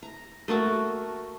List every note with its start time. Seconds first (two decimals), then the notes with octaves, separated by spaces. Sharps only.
0.03 A#5
0.48 A3 A#3 F#4 A5